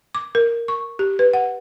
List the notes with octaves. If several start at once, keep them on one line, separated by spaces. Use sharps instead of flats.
D6
A#4
C#6
G4
B4
F#5